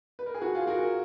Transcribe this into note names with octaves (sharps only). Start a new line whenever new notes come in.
B4
A#4
G#4
F#4
F4 G#4
F#4 A#4